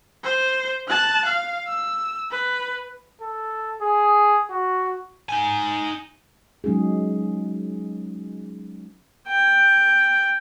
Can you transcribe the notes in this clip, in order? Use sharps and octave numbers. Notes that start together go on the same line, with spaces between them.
C5
A5 F#6
F5
E6
B4
A4
G#4
F#4
D#4 G#5
F#3 G#3 C#4 D#4 G#4
G5